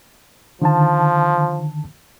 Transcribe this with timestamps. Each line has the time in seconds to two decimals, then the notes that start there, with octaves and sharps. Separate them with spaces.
0.62 D3 D#3 F3 A5